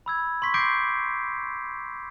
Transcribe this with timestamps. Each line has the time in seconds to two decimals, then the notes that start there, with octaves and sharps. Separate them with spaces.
0.06 B5 E6 G#6
0.42 C6 C#6 B6
0.54 D6 G6 A#6 C7 D7